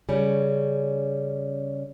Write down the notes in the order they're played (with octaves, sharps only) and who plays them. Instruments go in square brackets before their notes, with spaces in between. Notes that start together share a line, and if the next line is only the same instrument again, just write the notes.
[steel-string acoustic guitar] C#3 G3 C#4